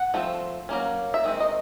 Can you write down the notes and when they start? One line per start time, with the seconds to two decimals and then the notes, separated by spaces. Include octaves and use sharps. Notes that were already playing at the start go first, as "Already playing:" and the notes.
Already playing: F#5
0.14 F3 A3 C4
0.69 F#3 A#3 C#4
1.14 E5
1.24 D#3 G#3 C4
1.40 D#5